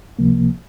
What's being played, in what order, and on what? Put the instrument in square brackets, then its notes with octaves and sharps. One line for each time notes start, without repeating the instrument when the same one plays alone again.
[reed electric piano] C#2 C3 F3 A#3